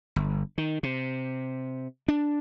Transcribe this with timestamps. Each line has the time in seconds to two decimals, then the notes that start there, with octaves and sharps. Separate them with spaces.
0.16 G1
0.58 D#3
0.83 C3
2.08 D4